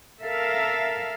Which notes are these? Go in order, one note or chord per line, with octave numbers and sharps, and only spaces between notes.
A4 A#4 E5 F5